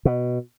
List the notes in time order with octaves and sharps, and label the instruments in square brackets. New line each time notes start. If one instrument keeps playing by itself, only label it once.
[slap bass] B2